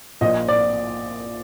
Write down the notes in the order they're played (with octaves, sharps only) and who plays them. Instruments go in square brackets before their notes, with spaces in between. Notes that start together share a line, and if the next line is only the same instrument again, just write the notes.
[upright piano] A#1 A#2 F3 D#5
D5